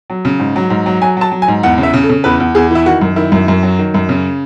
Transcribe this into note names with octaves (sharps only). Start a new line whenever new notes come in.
F#3
C#3
G#2
F#3
G#2
F#3
F#3 G#5
F#3 A5
F#3
G#5
G#2
E2 F#5
C#3
E5
C#3
A4
C#3
E2 B4
E2
E2 G#4
E3 E4
D#3 F#4
F#2
D#3 E4
F#2
F#2
F#3
D#3
F#2
C#3